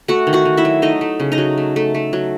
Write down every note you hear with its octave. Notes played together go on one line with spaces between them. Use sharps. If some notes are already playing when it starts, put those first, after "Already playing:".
A3 F#4 F#5
D#3
F#4 F#5
D#3
E4 E5
F#3
A3 D#4 D#5
A3
C#3
D#4 D#5
F#3
A3
A3
A3
F#3